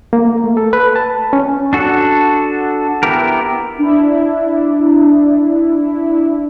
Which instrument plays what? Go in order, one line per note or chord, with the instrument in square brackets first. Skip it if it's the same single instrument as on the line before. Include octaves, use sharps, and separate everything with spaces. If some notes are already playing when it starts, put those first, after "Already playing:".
[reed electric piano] A#3
A3
A4
B4
A5
C#4
[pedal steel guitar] D4 F#4 A4
B3 E4 G4 A#4
[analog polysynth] D4 E4